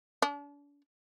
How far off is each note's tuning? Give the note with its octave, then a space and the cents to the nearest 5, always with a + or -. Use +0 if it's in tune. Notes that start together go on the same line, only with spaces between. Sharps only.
D4 -40